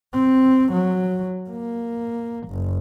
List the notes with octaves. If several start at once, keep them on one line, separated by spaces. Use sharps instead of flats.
C4
F#3
A#3
F#1